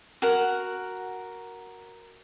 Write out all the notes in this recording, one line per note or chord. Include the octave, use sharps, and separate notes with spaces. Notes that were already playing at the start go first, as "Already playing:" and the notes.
F#4 A#4 F#5